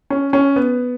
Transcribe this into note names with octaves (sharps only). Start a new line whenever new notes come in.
C#4
C#4
B3